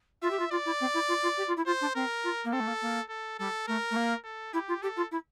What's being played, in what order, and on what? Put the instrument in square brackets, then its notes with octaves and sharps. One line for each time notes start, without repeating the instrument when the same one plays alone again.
[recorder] F4 [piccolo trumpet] E5
[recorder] G4
F4
[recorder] F4 [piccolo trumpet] D5
[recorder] E4
C4
E4
F4
F4
G4
F4
E4
[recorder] F4 [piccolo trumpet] C5
[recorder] D4
[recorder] C4 [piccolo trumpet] A#4
[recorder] F4
A#3
[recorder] C4 [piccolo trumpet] A4
[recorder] A3
A#3
A#3
[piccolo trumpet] A4
[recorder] G3 [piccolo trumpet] A4
[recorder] A3 [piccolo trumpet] A#4
[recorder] A3
A#3
[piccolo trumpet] A4
[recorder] E4 [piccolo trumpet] G4
[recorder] F4
[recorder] G4 [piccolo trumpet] A4
[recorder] F4
E4